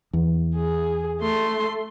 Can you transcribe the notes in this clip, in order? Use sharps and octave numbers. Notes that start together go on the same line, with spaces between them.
E2
G#4
A3 C6